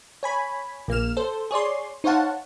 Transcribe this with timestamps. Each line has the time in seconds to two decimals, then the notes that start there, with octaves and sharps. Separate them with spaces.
0.23 C#5 G#5 B5
0.88 A#1 A#3 F6 E7
1.17 A4 C5
1.51 G#4 C#5 D5 C6
2.04 D#4 C5 C#5 F5 F#5 A5